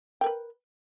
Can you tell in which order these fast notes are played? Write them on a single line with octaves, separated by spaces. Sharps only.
G5 A#4 B4